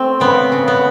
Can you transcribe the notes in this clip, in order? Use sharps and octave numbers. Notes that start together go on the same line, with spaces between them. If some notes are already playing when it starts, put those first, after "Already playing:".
Already playing: A3 C4
C#3 B3
C#3
B3